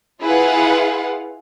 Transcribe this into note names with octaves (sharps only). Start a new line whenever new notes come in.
E4 F4 G#4 B4 F5 F#5